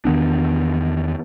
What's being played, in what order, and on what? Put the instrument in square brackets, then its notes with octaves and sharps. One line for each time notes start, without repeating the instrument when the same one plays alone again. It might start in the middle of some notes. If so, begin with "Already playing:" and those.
[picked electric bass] E2 D#3 B3 D4